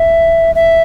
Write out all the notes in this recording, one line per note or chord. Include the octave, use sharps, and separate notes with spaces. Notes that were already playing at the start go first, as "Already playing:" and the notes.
Already playing: E5
E5